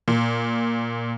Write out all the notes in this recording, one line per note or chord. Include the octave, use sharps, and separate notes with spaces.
A#2